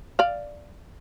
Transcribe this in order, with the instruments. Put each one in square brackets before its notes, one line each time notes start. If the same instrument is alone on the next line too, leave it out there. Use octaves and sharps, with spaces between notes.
[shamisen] D5 F5